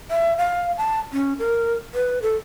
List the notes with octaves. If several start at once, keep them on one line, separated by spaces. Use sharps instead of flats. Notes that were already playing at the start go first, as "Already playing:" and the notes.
E5
F5
A5
C#4
A#4
B4
A4